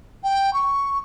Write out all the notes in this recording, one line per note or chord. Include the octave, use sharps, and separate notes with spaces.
G5
C#6